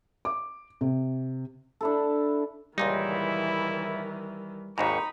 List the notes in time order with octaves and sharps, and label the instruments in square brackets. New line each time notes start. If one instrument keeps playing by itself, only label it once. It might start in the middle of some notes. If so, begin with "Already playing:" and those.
[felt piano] D6
C3
[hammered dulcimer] D4 E4 A4
[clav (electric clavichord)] C#2 A#2 D#4 [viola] D#3 E3 [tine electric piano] G3 [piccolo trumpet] E4
[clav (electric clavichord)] G#1 D#2 G#2 [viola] D#4 B5 [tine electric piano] A#5 [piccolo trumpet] C#6